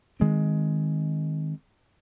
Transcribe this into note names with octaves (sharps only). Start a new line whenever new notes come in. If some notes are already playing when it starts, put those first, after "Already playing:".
D#3 G#3 C4